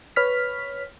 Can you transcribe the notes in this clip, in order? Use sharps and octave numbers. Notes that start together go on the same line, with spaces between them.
B4 C#5 F6 B6